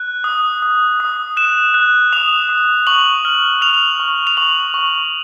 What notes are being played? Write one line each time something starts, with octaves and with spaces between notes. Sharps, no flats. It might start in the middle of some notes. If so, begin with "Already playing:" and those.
Already playing: F#6
D#6
D#6
D#6
F#6 E7
F#6
D#6 F7
D#6
C#6 F#7
F6
F6 F7
C#6
F7
C#6 F#7
C#6